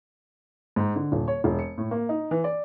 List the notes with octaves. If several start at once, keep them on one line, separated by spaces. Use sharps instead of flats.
G#2
D3
D#1
C#5
E1
C#7
A2
A#3
D#4
E3
D5